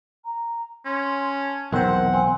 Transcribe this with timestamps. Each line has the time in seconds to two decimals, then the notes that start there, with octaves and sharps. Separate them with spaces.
0.25 A#5
0.85 C#4 C6
1.41 A5
1.73 B1 E2 D#3 C4 C5 F#5
2.13 C4 G#5